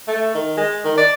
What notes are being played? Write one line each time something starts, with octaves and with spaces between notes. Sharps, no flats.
A3
D#3
G#3
D#3
D5